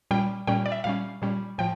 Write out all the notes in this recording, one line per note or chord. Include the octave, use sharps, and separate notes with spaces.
A#2 G3 C#4 G5
A#2 G3 C#4 G5
D5
E5
A#2 G3 C#4 F5
A#2 G3 C#4
A2 F3 G5